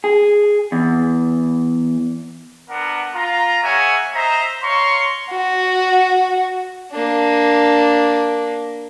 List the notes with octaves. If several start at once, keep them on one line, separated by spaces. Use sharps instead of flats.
G#4
E2
B3 D4 A#4 F#5
F4 A#5
A#3 G#4 C#5 E5 F#5 G#5
C5 D#5 E5 A#5
C#5 F5 A#5 C6 C#6
F#4
A#3 D4